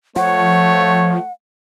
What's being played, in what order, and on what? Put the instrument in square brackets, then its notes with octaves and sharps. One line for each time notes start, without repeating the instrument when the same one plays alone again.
[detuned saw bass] F3 [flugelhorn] A3 [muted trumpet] C#5 [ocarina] F#5